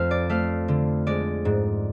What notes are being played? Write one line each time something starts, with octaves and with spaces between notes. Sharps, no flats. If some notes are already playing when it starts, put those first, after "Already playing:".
Already playing: F2 A3 F5
D5
A3 F5
D3
G#3 D5
G#2